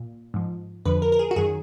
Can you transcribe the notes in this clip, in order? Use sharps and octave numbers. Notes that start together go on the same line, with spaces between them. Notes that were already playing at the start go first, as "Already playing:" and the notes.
Already playing: A#2
G#2 F3
F2 D3 F3 B4
A#4
A#4
G#4
F#4
F#2 D#3 F#3 G#4